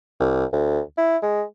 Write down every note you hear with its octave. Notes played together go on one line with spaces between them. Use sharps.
C2
D2
E4
G#3